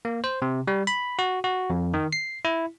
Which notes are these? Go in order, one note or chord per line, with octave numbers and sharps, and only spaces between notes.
A#3
C5
C3
G3
B5
F#4
F#4
F2
D#3
C7
E4